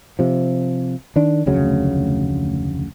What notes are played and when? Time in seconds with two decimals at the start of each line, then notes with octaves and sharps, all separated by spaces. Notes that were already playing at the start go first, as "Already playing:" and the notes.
0.19 C3 F3
1.16 D#3 D4
1.46 F1 D2 C#3 F#3